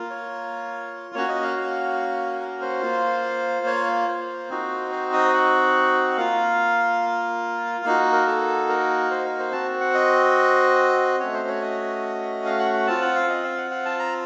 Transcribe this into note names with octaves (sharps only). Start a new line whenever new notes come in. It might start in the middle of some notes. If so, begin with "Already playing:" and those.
Already playing: A#3 F4
C#5
A#3 C#4 F#4 C#5
D#5
F5
F5
A#4
C5
A#3 F4
C#5
C5
C4 D#4 F#4
C5
D#5
F#5
A#3 F4 F5
A#3 D#4 F#4 F5
A#4
A4
A#4
C5
A#4
C5
C4 F#4 A5
F#5
D#5
A3 C#4 F#4 C#5
C5
C#5
D#5
F5
F#5
F#5
C4 F4 A5
F#5
F5
D#5
F5
F#5
F#5
A5
A#5